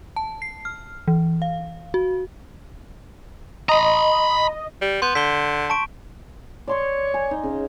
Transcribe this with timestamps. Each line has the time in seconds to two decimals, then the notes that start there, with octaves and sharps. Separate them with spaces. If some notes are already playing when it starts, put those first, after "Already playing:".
0.16 A5
0.42 C7
0.65 F6
1.08 E3
1.42 F5
1.94 F#4
3.69 D#5 A#5 B5
4.81 G3
5.02 B3 C6 G6
5.15 D3 B6 G7
5.70 A5 C#6 D7
6.68 C#5 D5 C6 C#6
7.14 G#5
7.31 D#4
7.43 C#3